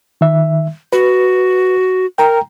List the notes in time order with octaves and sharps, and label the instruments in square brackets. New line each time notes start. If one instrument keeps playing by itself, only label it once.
[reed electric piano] D#3 E5
[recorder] F#4 [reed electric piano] B4
[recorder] A#4 [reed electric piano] G5 A#5